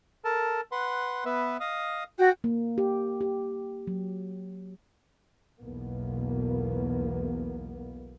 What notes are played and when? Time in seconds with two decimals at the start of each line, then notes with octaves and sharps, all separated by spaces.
0.25 A4 A#4 A5
0.72 B4 F#5 C6
1.25 B3 B4 E5
1.60 D#5 F5 D#6
2.19 F#4 F#5 G5
2.44 A#3
2.78 G4
3.21 G4
3.87 F#3
5.61 B1 E2 B2 A#3 B3